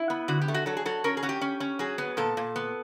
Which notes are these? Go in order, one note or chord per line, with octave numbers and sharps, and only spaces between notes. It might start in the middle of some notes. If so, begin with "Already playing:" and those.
Already playing: E4
B3
D3 F#4
G4
A3
F#4
F#3 A4
G#4
F#3 A4
C#4 A#4
G#4
C#4 F#4
G4
C#4
C#4
F#3 G#4
B3
A#2 A4
A#2
B3